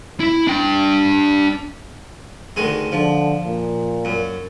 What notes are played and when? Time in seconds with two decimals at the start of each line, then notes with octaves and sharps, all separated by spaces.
0.20 E4
0.47 D4 G5
2.56 D2 D#3 G#3
2.92 D3 F3
3.44 A#2
4.05 F#2